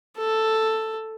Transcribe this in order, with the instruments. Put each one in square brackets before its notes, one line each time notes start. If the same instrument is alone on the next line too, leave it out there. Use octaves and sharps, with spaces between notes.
[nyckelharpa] A4